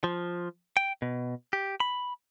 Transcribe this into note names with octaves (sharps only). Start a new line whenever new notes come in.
F3
G5
B2
G4
B5